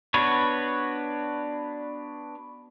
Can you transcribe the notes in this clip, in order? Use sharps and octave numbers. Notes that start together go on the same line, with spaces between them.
B3 D4 F#4 B4 C#5